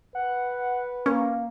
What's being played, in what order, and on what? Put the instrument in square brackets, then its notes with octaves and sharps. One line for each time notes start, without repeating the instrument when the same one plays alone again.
[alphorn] B4 [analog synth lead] F#5
[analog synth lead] A#3 [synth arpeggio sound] C#4